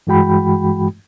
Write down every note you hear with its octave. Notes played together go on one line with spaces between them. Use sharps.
G2 E3 G#3 F#4 G5 B5